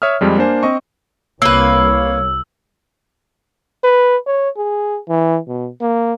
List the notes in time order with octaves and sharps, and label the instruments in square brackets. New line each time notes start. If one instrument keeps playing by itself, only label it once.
[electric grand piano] C#5 E5 D#6 F6
F2 G3 G#3
A#3 D4 C5 G#5
C4 D#5 C#6
[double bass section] C2 [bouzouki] A#3 B4 [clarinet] C#5 [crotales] E6
[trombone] B4
C#5
G#4
E3
B2
A#3